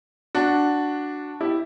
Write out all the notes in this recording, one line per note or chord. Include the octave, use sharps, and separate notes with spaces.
D4 F#4
E4 G4